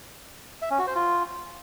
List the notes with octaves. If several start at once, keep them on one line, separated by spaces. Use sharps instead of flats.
E5
C#4
F#4
C5
F4